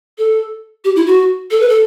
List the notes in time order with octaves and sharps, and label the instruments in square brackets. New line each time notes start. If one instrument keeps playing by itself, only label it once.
[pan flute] A4
G4
E4
F#4
A4
B4
A4